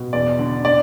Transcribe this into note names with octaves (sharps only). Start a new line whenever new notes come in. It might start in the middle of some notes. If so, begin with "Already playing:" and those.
Already playing: B2
E2 D5
D3
D5